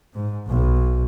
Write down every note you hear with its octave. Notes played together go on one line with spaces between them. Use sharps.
G#2
B1